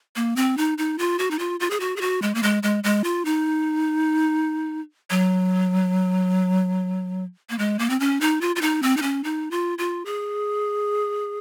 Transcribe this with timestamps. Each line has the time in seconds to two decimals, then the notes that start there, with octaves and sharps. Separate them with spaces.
0.16 A#3
0.36 C4
0.57 D#4
0.78 D#4
0.98 F4
1.19 F#4
1.31 D#4
1.39 F4
1.60 F4
1.70 G#4
1.80 F#4
1.96 G#4
2.01 F#4
2.22 G#3
2.35 A#3
2.43 G#3
2.63 G#3
2.84 G#3
3.04 F4
3.25 D#4
5.10 F#3
7.50 A#3
7.58 G#3
7.79 A#3
7.90 C4
8.00 C#4
8.21 D#4
8.41 F4
8.56 F4
8.61 D#4
8.82 C4
8.97 D#4
9.02 C#4
9.24 D#4
9.51 F4
9.78 F4
10.05 G#4